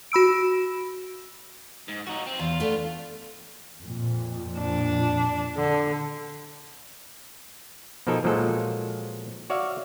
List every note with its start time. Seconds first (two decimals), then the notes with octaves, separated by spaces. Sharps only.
0.12 F#4 B5 E6 D7
1.88 G#2
2.07 D#4 F4 F#4
2.26 C4
2.39 E2 F4
2.60 A3 B3 D4
3.79 F2 A#2
4.59 D4
5.57 D3
8.07 B2 F3 D#4 A4 A#4 G#5
8.24 A#2 F3 F#3 G#3 A4
9.50 F#4 C#5 D5 E5 F5